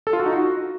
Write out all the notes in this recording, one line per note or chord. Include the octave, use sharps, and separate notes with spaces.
A4
F4
F#4
D#4
F#4